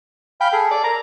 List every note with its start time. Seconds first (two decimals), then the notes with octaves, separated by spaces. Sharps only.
0.41 F5 G5 B5
0.53 G#4 A4
0.71 D5
0.84 A#5